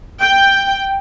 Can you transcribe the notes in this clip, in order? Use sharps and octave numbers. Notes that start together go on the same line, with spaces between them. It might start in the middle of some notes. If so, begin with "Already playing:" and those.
G5